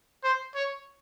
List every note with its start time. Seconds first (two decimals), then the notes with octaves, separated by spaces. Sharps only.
0.24 C5
0.55 C#5